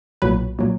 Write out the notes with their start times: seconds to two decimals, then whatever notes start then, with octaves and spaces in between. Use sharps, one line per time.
0.22 B1 A#2 F#3 B4
0.59 A#2 F#3